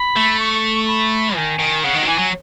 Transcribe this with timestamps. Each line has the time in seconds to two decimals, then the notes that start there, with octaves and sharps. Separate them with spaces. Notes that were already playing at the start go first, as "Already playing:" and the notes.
Already playing: B5
0.16 A3
0.40 C#6
0.87 B5
1.35 D#3 G#5
1.59 D#3
1.82 C#3 F#5
1.95 D#3
2.02 F#3
2.07 E3 G#5
2.18 F#3